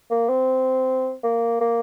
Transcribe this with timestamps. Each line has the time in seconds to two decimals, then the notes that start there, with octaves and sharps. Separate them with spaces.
0.10 A#3
0.29 C4
1.23 A#3
1.61 A#3